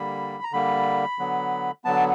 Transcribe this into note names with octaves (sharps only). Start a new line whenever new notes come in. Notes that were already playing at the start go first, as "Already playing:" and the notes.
Already playing: D3 G3 A#3 B5
A#5
D3 G3 A#3 B5
D3 F#3 B3
D3 F#3 B3 A5